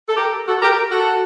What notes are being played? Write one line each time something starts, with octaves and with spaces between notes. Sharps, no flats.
A4
G4 A#4
F#4 A4
G4 A#4
F#4 A4